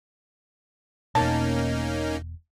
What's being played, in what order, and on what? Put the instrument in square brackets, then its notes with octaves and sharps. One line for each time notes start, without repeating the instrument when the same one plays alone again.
[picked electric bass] E1 B2 [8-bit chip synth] A#3 C#4 D#4 [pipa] A5